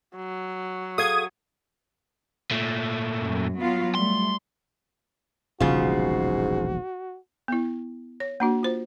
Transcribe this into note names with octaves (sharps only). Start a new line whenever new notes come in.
F#3
G#4 A4 F5 D#6 G#6
A#2 A3
F#2
F#3 B3 F4
G3 A3 C6
E1 A#1 G#2 C#3 G3 F4 F#4
B3 E4
C#5
A#3 D4 F#4
F4 C5